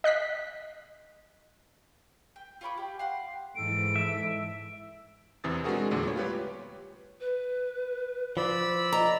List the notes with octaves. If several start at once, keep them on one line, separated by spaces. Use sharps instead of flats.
D#5 F#6 B6 C7
G5
F4 C#5 B5 D6
G4 G5
F5 F#5 C6
G#2 E3 A4 D7
E5
E2 C3 E3 D#6 A6
G#3 C4 D4 F#4 G#4 A#4
E2 A#2 D3 A3
G3 B3 C#5
F4 G4 B4 C#5
B4
F3 D5 B5 E6
D#5 A#5